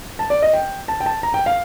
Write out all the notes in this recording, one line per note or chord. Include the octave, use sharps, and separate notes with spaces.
A5
D5
D#5
G5
A5
G5
A5
A#5
G5
F5